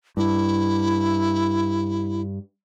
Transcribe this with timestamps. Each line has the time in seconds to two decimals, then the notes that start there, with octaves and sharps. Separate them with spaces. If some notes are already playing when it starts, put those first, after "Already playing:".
0.17 G2 E4